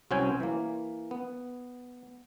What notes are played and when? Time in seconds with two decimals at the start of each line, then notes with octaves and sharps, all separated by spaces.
0.11 C2 F#3 C4 C#4 G5 G#5
0.40 E3 A#3
1.11 B3